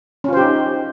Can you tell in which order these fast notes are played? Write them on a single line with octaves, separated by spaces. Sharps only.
C#4 F4 C5 G4 D#4